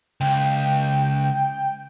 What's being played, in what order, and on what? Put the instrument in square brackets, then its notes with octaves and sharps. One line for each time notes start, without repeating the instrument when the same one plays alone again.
[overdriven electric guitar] C#2 [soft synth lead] G5